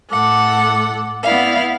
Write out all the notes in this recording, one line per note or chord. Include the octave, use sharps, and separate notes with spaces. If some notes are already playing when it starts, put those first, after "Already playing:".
A2 A4 F#5 D6
B3 E4 D5 F5